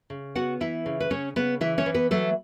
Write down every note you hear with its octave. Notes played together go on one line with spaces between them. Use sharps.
C#3
B3 F#4 F#5
E3 E4 E5
C#3
B4
C#3 C#4 C#5
C#3 B3 B4
E3 E4 E5
C#4 C#5
E3
B3 B4
F#3 A3 A4